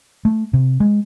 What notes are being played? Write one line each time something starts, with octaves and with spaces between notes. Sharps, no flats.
A3
C3
G#3